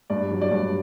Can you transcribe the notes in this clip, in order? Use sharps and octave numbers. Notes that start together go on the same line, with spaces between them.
G2 D5
F#3
D5
G2